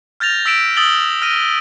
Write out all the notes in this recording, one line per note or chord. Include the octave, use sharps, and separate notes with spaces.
F6 G6 A6 A#6 F7
E6 B6 D7 E7
D#6 E6 A6 F#7 G7
F6 A#6 D#7